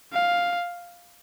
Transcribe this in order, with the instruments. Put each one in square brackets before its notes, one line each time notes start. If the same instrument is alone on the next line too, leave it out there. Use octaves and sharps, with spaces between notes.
[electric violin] F5